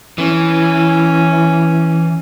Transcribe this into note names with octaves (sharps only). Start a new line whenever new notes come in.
E3 C#4